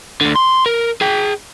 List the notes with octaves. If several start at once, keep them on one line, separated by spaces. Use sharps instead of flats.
D2 D3
C6
A#4
G#4 G5